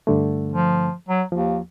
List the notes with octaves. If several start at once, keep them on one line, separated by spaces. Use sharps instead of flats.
G2 D3 A3
F3
F#3
D#2 F3